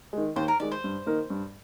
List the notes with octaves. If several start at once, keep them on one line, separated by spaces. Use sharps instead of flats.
D#3 G#3
D#2 C5
A#4
D#3 G#3 D5
C5
G2
D#3 A#3 D#4 A#4
G2